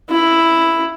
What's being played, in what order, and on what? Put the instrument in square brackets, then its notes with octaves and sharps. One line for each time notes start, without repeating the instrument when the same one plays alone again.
[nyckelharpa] E4